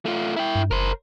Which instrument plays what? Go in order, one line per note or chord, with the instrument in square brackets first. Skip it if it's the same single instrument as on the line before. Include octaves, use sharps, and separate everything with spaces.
[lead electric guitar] A3 F4
E4 G5
[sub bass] G2
[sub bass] F#1 [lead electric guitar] A#4 C5